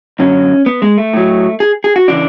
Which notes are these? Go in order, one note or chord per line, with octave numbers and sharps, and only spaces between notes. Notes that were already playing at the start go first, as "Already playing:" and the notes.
F#2 D3 F#3 C#4
B3
G#3
A3
A2 F#3
G#4
G#4
F#4
C#3 E3 D4